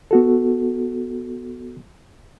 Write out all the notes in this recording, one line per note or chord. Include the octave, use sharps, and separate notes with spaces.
B3 F#4 A4